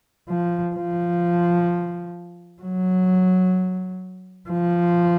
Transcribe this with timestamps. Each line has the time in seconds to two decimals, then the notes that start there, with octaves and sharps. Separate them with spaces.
0.29 F3
0.75 F3
2.62 F#3
4.49 F3